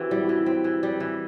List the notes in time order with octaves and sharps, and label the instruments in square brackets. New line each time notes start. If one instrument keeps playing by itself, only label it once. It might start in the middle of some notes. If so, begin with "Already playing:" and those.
Already playing: [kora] E3 C4 [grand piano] F#4 G4 B4 C5
[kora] G3 [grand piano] E4
[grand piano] F#4
[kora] E3
[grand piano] E4
[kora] C4
E3
G3
E3